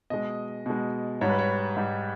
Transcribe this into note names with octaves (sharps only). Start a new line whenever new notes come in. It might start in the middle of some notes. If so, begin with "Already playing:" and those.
B2 G#3 D#5
B2 G#3
G#2 G3 C#5
B4
C#5
G#2 G3